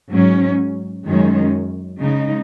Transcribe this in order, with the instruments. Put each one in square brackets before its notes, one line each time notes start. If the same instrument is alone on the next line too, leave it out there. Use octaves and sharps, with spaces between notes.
[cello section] G#2 F#3 C#4
F#2 D#3 G#3 C#4
C#3 G#3 D#4